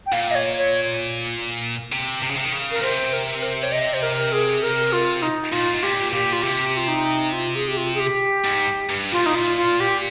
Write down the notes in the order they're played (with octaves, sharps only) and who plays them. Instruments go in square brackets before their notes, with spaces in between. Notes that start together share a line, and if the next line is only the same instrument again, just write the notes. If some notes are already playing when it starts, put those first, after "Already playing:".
[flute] G5
[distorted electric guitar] A#2 [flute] F5
[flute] D#5
C#5
C#5
[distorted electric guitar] C3
C3
C#3
C3
D#3
C#3
[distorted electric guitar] A#2 [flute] A#4
[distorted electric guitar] C3 [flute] C5
[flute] A#4
C5
C#5
D#5
C5
A#4
G#4
A#4
F4
D#4
[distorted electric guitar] A#2 [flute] F4
[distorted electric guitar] G#2
[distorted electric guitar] A#2 [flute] G4
[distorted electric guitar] A#2 [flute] G4
[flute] F4
[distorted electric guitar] C3 [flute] G4
[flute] F4
D#4
F4
G#4
G4
F4
G#4
G4
[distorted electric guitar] G#2
G2
[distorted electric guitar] A#2 [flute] F4
[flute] D#4
F4
F4
G4